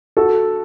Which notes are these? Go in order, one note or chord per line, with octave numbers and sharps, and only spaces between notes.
F#4 A4